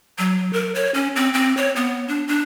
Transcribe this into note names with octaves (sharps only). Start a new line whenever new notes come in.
F#3
A#4
C#5
C#4
C4
C4
C#5
B3
D4
D4